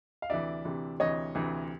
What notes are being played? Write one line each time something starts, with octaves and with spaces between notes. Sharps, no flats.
F5
D2 C3 E3 D5 E5
D2 C3 E3
D2 C3 E3 C#5 D#5
D2 C3 E3